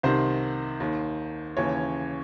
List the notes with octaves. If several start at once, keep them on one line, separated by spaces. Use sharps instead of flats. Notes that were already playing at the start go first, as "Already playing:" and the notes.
C2 C3 D#3 C5
D#2 D#3
D#2 C#3 E3 C#5